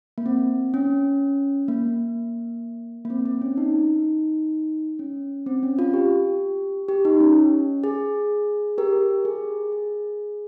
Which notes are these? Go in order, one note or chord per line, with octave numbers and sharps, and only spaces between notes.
A#3
C4
C#4
A#3
A#3
C4
C4
C#4
D#4
C#4
C4
C#4
F4
G4
G4
D#4
C#4
G#4
G4 A#4
G#4
G#4